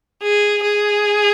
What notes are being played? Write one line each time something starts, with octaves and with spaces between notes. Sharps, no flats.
G#4
G#4